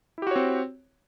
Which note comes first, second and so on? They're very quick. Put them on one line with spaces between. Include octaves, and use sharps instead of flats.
E4 G4 F#4 C#5 C4